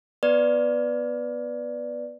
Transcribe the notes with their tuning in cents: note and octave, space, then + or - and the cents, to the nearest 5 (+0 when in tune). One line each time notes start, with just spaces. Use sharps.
B3 +0 B4 +0 D5 +0